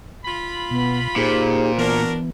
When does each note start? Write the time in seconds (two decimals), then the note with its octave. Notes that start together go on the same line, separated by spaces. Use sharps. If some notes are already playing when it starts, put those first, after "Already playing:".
0.25 F4 B5
0.71 B2 B3
1.16 A#2 D#4 G4 G#4 C5
1.78 E3 B3 D4 F#4 A#4